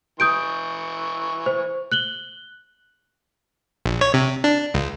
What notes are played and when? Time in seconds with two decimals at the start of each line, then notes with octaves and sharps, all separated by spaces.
0.20 E3 C#6 D#6 G6 D7
1.46 C5
1.92 F#6 F#7 G7
3.86 A#1
4.01 C#5
4.14 C3
4.44 D4
4.74 C#2